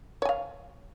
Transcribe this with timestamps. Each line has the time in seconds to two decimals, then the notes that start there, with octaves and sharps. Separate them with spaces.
0.22 C#5
0.25 G#5
0.29 F5